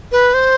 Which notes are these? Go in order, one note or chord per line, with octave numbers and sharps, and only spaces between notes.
B4
C5